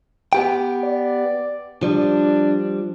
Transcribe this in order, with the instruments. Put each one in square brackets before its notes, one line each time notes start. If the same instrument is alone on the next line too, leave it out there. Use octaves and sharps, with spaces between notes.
[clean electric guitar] B3 G4 G5
[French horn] D5
[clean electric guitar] F3 G3 [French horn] D4